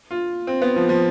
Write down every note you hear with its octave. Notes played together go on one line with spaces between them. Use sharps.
F4
C4
B3
F3
F3